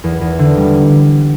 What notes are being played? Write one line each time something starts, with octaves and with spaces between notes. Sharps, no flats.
E2
E2
D3
G3